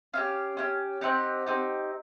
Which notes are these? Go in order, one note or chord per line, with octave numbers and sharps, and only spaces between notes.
C#4 E4 G4 F5
C#4 E4 G4
C4 D#4 G4 F#5
C4 D#4 G4